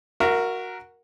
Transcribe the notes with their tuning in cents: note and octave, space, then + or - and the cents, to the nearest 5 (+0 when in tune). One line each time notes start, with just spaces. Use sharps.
F#4 -5 A#4 +0 E5 +40